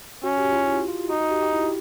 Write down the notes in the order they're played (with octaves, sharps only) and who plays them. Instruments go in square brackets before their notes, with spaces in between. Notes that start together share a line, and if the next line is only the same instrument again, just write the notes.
[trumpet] C#4 [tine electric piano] F#4
[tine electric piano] G4
F4
E4
F4
[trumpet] D#4 [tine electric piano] F#4
[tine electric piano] F#4
G4
G4
E4